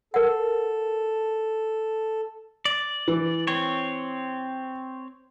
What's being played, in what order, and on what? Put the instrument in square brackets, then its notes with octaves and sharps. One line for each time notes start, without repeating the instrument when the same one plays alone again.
[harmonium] A4 [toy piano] A#4 F#5
[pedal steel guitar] D5
[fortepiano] E3
[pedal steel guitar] C4 C#5